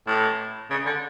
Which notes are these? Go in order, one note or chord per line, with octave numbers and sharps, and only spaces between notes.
A2
C#3
D3